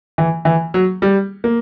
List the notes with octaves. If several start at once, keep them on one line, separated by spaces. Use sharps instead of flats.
E3
E3
F#3
G3
A#3